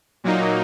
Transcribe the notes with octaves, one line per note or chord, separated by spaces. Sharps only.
A#2 F#3 A#3 D#4